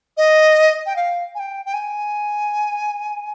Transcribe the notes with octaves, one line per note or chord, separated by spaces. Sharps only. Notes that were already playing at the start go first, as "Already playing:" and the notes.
D#5
G5
F5
G#5
G5
G5
G#5